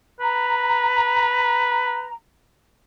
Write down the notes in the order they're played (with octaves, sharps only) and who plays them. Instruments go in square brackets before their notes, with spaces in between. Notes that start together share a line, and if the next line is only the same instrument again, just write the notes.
[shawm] B4 [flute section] A#5